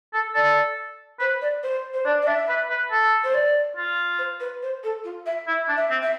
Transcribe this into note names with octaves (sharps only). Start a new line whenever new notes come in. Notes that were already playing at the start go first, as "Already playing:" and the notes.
A4
A4 D5
B4 C5
D5
C5
C5
D4 D5
D5
D4 E5
B4
B4
A4
C5
D5
F4
C5
B4
C5
A4
F4
E5
E4
E5
D4
E5
C4
E5